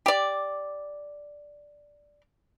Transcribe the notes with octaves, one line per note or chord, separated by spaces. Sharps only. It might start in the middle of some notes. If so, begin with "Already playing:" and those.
G4 D5